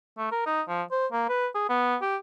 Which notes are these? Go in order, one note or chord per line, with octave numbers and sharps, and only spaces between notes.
A3
A#4
D#4
F3
C5
A#3
B4
G#4
B3
G4